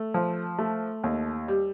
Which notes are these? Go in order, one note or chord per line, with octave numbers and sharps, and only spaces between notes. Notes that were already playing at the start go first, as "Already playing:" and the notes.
Already playing: A3
F3
A3
D#2
G3